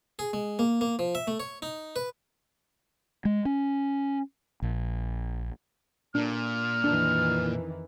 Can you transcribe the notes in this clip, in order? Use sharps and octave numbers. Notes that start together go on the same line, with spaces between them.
G#4
G#3
A#3
A#3
F3
E5
A3
C#5
D#4
B4
G#3
C#4
A#1
A#2 D4 F6
F2 D#3 E3 D4